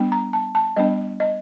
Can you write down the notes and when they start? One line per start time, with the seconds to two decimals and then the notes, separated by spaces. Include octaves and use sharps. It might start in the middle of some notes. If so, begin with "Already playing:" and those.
Already playing: G3 B3 D4
0.12 A#5
0.33 A5
0.55 A5
0.76 G3 B3 D4 D#5
1.20 D#5